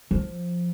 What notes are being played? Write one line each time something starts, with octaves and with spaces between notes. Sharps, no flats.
F3